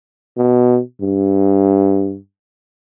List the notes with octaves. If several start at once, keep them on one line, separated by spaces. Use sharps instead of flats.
B2
G2